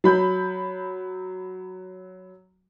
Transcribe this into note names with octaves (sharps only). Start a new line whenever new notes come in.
F#3 B5 G6